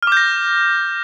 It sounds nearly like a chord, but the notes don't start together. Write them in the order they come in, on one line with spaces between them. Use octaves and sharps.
F6 D6 G6 A#6